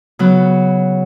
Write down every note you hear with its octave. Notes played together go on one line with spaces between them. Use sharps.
C#3 F#3 B3